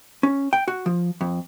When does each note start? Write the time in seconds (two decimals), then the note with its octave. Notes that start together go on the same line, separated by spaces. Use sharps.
0.23 C#4
0.53 G5
0.68 F#4
0.86 F3
1.21 F2